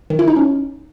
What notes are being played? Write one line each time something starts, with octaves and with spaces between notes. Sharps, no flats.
D#3
E4
D#4
C#4